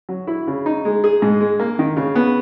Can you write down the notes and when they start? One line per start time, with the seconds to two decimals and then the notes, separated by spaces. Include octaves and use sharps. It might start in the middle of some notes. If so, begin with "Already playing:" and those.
0.09 F#3
0.27 E4
0.47 C#3
0.66 D#4
0.85 G#3
1.04 G#4
1.22 G#2
1.40 G#3
1.60 A#3
1.79 D#3
1.97 C#3
2.15 B3